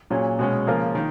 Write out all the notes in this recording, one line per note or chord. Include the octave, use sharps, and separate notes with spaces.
A#2 F#3 C#4 G#4
B2 G#3 C#4
C#3 F3 A#3 F4 A#4
D#3